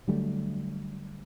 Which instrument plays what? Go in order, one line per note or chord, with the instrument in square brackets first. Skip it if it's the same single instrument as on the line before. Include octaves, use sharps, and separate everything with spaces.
[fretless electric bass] D3 F#3 G3 A3